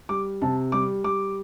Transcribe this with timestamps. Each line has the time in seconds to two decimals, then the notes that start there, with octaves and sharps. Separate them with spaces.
0.09 G3 D6
0.42 C3 A5
0.72 G3 D6
1.04 G3 D6